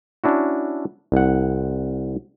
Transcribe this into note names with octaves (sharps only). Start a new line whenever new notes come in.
C#4 D4 E4 F#4
C2 F#5